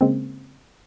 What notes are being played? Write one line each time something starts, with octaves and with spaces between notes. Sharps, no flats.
C#3 G#3 A#3 C4